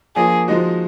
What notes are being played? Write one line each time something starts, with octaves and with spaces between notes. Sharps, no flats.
F3 A#3 D4 G#4
F3 G#3 D#4 F#4